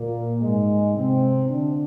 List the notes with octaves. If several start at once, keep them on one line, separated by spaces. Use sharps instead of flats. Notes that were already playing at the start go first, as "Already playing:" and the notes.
Already playing: A#2 A#3
G#2 G#3
C3 C4
D3 D4